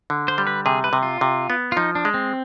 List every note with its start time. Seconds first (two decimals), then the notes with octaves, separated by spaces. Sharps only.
0.10 D3
0.28 C5
0.38 G3
0.47 B4
0.66 C3 G#4
0.84 B4
0.93 C3
1.03 F4
1.21 C3
1.50 B3
1.72 F4
1.76 F3 D#4
1.95 D4
2.05 G#3
2.14 C4